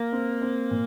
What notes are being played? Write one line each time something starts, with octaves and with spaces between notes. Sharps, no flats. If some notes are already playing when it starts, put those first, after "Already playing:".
Already playing: A#3
C4
C4
A#2